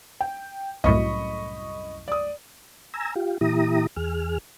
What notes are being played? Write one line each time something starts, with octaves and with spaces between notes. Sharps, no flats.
G5
C2 F#2 A2 D#5 B5 C#6
D5 D#6
G#5 A#5 E6
F4 G4
A#2 E3 E4 G4 A#5 D#6
E2 G#4 F6